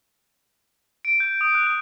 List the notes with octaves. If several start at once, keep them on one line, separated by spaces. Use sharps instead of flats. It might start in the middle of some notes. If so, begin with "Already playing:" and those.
D7
G6
D#6
F#6
D#6